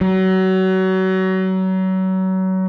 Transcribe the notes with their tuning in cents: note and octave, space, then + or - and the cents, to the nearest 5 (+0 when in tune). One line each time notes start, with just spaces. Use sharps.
F#3 +30